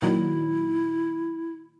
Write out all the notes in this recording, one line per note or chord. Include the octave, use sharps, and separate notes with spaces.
A#2 D#3 F#3 E4